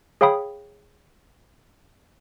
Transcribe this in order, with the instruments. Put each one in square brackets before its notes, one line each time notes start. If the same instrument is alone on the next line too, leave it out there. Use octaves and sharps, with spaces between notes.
[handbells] G#4 C#5 F5 G5 B5 D#6